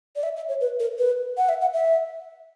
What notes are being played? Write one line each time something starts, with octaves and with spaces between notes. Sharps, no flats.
D5
E5
E5
C#5
B4
A#4
B4
F#5
E5
F#5
E5